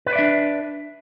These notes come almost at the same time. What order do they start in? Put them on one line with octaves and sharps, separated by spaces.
B4 C5 D5 E5 D4